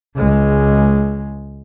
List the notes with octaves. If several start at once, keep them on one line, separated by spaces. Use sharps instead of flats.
C#2 G#3